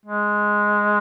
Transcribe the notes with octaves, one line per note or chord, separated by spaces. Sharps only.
G#3